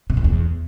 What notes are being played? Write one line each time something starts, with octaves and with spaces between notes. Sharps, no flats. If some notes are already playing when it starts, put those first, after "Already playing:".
C3
A2
E2